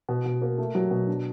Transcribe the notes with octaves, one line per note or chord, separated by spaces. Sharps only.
B2
B2
A#3
A3
F#3
B2
D4